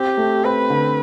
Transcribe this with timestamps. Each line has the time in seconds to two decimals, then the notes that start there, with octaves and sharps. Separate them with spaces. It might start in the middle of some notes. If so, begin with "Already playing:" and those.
Already playing: C4 G4
0.17 A3
0.44 C4 B4
0.70 D3